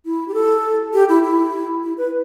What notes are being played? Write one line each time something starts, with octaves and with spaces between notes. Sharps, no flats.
E4
G4
A4
G4
E4
E4
E4
B4